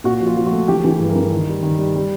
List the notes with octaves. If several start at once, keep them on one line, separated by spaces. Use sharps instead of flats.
A#2 F#4
F3
F4
F3
F#4
A3
E3 G4
E3 G#4
G2
A#4
E3
D#3
G3
D#3
G3
G3